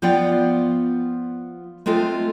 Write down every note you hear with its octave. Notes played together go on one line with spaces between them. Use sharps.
F3 B3 F4 D5 F#5 G5
G#3 A3 C4 F4 A4